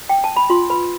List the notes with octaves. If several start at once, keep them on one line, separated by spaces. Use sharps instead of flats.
G5
A5
B5
F4 C6
B4 B5